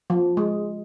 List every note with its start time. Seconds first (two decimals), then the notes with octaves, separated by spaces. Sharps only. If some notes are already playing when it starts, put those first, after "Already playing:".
0.10 F3
0.37 G#3